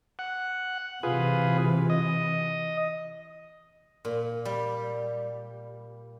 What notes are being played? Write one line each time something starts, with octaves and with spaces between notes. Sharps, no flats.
F#5
C3 E3 F4 G#4 B4
D#5
A#2
G3